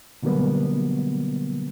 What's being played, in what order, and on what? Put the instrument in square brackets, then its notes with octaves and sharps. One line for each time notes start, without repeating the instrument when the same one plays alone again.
[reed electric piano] B2 D3 F#3 G3 A#3 B3